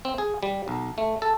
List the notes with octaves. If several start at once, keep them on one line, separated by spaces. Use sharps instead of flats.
C4
G#4
G3
B1
A3
A4